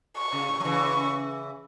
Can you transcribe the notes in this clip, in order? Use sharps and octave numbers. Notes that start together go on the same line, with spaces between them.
C#6
C#3
A2
F#3
C#3 E3 C#6